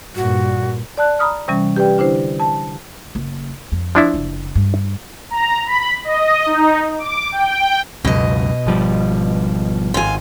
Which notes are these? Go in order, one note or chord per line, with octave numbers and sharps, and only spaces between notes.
G2 A#2 F#4
D5 A5 F#6
A#5 B5 D#6 F6
C3 E3 G3 C#4
G4 B4 D5 G5
D3 D4 E4 C5
A5
F#1
F2
F3 D4 E4
F#1
G2
A#5
B5
D#5
D#4
D6
G5
C#2 F#2 B2 D#5
G#1 F3 G3
G#1 F4 G#5